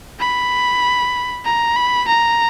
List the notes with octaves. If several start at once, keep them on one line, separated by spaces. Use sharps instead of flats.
B5
A#5
B5
A#5